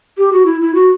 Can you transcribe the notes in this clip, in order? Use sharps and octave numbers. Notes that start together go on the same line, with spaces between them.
G4
F#4
E4
E4
F#4